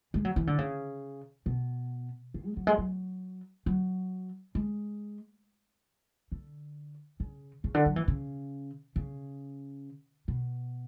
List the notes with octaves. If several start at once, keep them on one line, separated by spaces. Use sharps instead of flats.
G#3
F#3
E3
D3
C#3
B2
C#3
G#3
F#3
G#3
F#3
F#3
G#3
D3
C#3
C#3
D3
F#3
E3
C#3
C#3
B2